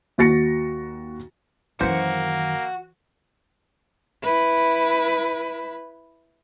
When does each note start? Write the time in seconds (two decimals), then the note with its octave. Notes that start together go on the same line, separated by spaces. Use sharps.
0.18 D#2 F#4 A6 A#6 C#7
1.81 F#2 D#3 E3 A#3 F#4 C5 C#7
4.23 E4 B4